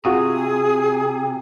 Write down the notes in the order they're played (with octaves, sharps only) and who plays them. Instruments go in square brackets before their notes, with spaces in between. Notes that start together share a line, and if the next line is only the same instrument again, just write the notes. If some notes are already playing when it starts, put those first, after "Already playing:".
[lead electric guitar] C3 [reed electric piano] F4 F#4 D#6 [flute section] G#4